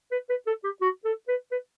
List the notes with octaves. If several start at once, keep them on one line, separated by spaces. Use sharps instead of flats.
B4
B4
A4
G4
F#4
A4
B4
B4